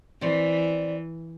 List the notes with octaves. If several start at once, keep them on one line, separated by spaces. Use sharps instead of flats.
E3 C4 D5